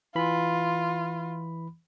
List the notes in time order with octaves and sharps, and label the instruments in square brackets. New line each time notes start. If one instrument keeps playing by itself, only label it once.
[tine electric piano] E3 B5 [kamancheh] F4